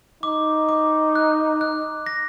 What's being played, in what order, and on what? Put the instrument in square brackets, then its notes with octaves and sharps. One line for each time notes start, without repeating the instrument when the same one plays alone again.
[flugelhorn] D#4 [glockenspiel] D6
[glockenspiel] D6
F#6
F#6
A#6